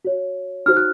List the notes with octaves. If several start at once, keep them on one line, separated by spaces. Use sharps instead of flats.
F#4 C#5
D#4 F#4 C5 F6
F#6